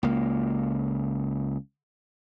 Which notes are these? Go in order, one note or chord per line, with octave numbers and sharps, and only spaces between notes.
C#2 A#3